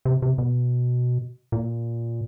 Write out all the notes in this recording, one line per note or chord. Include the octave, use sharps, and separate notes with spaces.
C3
C3
B2
A#2